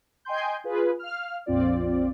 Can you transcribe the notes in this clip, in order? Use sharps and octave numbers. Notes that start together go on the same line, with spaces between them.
D#5 G5 G#5 C6 G6
F4 G#4 B4
F5 F6
A#1 F2 C4 F4 D5